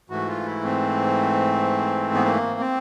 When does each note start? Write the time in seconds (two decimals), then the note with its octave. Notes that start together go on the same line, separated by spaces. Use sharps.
0.10 G#2 E3 A3 F#4
0.28 F4
0.45 E4
0.64 C4
2.14 B3
2.25 A#3
2.60 C4